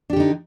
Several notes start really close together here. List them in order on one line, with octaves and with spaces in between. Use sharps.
D4 G4 D3 D#4